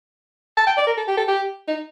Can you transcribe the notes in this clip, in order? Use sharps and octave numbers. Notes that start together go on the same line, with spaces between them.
A5
G5
D5
A#4
A4
G4
A4
G4
D#4